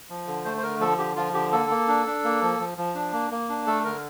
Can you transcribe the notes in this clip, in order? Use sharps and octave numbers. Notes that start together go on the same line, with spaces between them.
F3
D3
A3 C5
C5
D3 A#4
F3 A4
D3 G4
F3 F4
D3 G4
A#3 A4
A#3
D4
D4
A#3
F3
F3
F3
D4
A#3
A#3
D4
A3 A4
D3 A#4